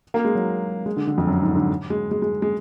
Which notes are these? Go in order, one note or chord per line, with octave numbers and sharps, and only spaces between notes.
A#3
G#3
F#3
G#3
D3
D3
F2
F#2
G#2
D3
G#3
G#3
G#3
G#3